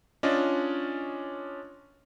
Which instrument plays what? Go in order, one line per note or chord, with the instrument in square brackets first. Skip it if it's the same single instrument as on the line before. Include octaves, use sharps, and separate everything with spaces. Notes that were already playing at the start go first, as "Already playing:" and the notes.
[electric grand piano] C#4 D4 F4 D5 D#5